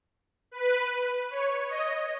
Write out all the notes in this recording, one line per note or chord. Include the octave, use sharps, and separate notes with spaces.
B4
C#5
D#5